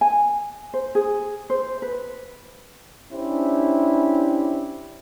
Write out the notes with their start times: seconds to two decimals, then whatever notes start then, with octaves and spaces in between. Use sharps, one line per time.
0.01 G#5
0.74 C5
0.95 G#4
1.50 C5
1.82 B4
3.12 C#4 D4 E4 G4 C5